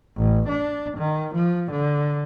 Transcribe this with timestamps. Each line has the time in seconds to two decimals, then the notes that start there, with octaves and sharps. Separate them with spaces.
0.17 A1
0.49 D4
0.97 D#3
1.34 F3
1.71 D3